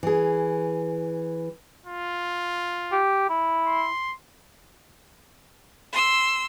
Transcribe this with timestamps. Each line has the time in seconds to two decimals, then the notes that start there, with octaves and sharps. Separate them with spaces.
0.03 E3 G#4
1.86 F4
2.92 G4
3.29 E4
3.67 C6
5.93 C6 E6